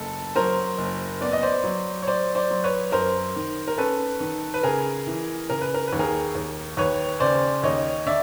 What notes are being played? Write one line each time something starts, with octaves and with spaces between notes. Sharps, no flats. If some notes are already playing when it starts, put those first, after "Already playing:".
Already playing: F#1 A4
F#3 A#4 C5
F#1
B3 D5
D#5
C5 D5
F#3
C#5
F#3 C5 D5
C5 D5
F#3
B4 C#5
F#2 A#4 C5
D#3
A#4
C#4 A4 B4
D#3
B4
C#3 G#4 A#4
E3
C#3 A#4
B4
A#4
B4
D#2
G#4 A#4
D#2
D#2 B4 C#5
C#3 C5 D5
D#2 C#5 D#5
D3 D5 E5